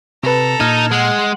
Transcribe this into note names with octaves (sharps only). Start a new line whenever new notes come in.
C3 A4 B4 A#5
A#2 D#4 F6 G#6
G#3 F#5 C6